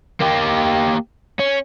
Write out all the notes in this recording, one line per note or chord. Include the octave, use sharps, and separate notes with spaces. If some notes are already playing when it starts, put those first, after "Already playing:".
A#3 G4
C#4